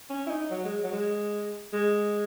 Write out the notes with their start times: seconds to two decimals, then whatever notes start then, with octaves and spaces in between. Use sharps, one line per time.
0.10 C#4
0.27 E4
0.31 D#4
0.51 F#3
0.65 G#3
0.84 F#3
0.92 G#3
1.73 G#3